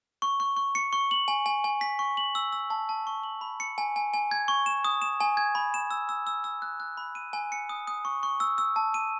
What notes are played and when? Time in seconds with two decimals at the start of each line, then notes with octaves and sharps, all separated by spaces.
0.22 C#6
0.40 C#6
0.57 C#6
0.75 C#7
0.93 C#6
1.11 F#7
1.28 G#5
1.46 G#5
1.64 G#5
1.81 B6
1.99 C#6
2.17 F#7
2.35 E6
2.53 E6
2.70 A5
2.89 A5
3.07 C#6
3.24 F#7
3.41 B5
3.60 C#7
3.78 G#5
3.96 G#5
4.14 G#5
4.31 G#6
4.48 C#6
4.66 E7
4.85 D#6
5.02 E7
5.21 G#5
5.37 G#6
5.55 B5
5.74 E7
5.91 E6
6.09 E6
6.27 E6
6.44 E6
6.62 F#6
6.80 F#6
6.97 B5
7.15 D#7
7.33 G#5
7.52 C#7
7.69 D#6
7.87 D#6
8.05 C#6
8.23 C#6
8.40 E6
8.58 E6
8.76 A5
8.94 D#7